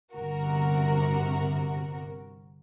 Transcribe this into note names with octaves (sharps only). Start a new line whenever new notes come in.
G1 C3 F#4 A#4